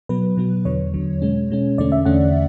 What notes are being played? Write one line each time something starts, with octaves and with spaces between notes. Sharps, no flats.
B2 F#3 B3 B4
B2 F#3 B3
E2 D3 F#3 C#5
E2 D3 F#3
B2 G#3 C#4
B2 G#3 C#4
E2 D3 A3 C#4 D5
E5
E2 D3 A3 C#4 F#5